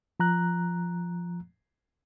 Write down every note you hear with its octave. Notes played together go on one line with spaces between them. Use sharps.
F3 A#5 F#6